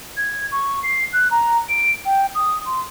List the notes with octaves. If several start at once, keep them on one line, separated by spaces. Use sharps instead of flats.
G#6
C#6
C7
F#6
A#5
D7
G5
D#6
C6